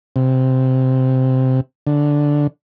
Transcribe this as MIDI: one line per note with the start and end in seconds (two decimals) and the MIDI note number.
0.16 1.60 48
1.87 2.47 50